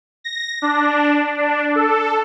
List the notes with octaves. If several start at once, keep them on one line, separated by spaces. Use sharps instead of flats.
A#6
D4
D4
A4